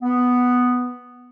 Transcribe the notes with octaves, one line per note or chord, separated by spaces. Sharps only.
B3